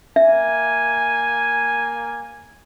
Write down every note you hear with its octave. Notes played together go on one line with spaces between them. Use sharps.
A#3 E5 G#5